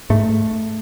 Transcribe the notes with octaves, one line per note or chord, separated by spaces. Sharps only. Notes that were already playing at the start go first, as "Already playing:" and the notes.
G#2 A3